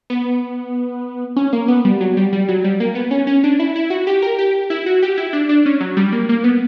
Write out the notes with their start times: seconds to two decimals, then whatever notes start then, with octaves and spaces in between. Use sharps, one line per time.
0.10 B3
1.36 C#4
1.53 A#3
1.68 B3
1.85 G3
2.01 F#3
2.17 G3
2.33 G3
2.49 F#3
2.64 G3
2.80 A#3
2.95 B3
3.11 C#4
3.27 C#4
3.44 D4
3.59 E4
3.76 E4
3.90 F#4
4.07 G4
4.22 A#4
4.38 G4
4.70 E4
4.86 F#4
5.02 G4
5.18 E4
5.33 D4
5.49 D4
5.66 C#4
5.81 F#3
5.97 G3
6.13 A#3
6.29 A#3
6.44 B3